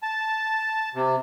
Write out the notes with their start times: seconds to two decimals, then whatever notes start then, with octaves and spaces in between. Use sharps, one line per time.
0.03 A5
0.95 C3